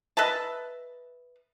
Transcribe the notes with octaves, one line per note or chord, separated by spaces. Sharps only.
B4 D#5 E5 A5